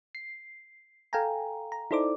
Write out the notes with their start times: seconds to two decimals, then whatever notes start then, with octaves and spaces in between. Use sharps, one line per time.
0.15 C7
1.13 A4 F5 G5 G#5 A#5
1.72 A#5
1.91 D#4 E4 A4 C5 D5 D6